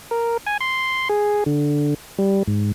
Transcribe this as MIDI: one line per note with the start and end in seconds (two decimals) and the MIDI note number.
0.11 0.37 70
0.47 0.57 80
0.61 1.08 84
1.09 1.44 68
1.46 1.94 50
2.18 2.43 55
2.47 2.72 44